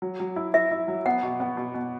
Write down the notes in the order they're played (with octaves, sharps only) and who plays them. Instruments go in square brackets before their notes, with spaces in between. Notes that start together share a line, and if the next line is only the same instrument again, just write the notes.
[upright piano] F#3
F#3
E4
[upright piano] E4 [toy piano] E5
[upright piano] E4
F#3
[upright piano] B3 [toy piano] F#5
[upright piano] B2
B3
B2
B2